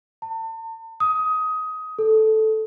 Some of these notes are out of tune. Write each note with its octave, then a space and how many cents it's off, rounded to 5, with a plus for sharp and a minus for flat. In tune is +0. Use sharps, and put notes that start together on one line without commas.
A5 +40
D#6 +15
A4 -10